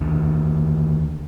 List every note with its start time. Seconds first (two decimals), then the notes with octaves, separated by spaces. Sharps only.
0.01 D#2 D3